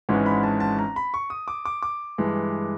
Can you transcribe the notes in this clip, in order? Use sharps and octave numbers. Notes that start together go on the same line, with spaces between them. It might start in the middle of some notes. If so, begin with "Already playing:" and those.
G#1 G#2 E3 G#3 C#4
B5
A5
A5
A#5
B5
C#6
D#6
D6
D6
D6
G2 E3 G#3